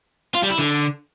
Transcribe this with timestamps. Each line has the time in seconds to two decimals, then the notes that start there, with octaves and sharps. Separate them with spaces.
0.35 F4
0.43 G3
0.51 E4
0.59 D3